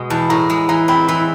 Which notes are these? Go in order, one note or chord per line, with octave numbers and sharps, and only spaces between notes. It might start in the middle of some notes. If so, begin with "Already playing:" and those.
Already playing: B2 G#3
E2 A5
A2 A#5
G#3
E3 A#5
C4 B5
E3 B5